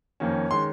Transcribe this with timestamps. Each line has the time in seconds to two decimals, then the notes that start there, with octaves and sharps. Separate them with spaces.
0.20 F2 D#3 A#3 C#4
0.51 D#3 G#3 C#4 C6